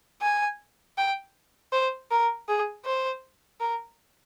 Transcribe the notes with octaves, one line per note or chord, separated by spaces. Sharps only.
G#5
G5
C5
A#4
G#4
C5
A#4